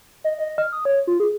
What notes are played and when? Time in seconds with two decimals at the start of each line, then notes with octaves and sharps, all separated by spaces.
0.24 D#5
0.39 D#5
0.58 F6
0.72 D#6
0.85 C#5
1.07 F4
1.20 G#4